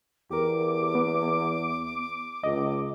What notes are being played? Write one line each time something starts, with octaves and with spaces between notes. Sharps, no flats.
E2 G4 A#4 D6
B3
C#2 D#5